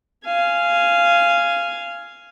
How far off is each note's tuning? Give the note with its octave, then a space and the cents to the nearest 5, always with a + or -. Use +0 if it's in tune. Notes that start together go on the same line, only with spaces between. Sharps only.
F5 -15 G#5 +0